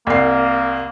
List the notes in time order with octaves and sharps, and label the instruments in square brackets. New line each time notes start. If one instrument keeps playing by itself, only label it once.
[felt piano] C2 C7 [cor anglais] A#3